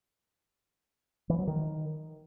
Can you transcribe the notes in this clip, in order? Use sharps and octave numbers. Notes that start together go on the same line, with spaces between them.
E3
F#3
D#3